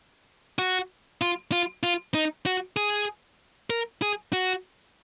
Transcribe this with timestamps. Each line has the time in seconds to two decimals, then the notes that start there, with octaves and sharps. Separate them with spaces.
0.59 F#4
1.21 F4
1.52 F4
1.83 F4
2.14 D#4
2.46 F#4
2.77 G#4
3.70 A#4
4.02 G#4
4.33 F#4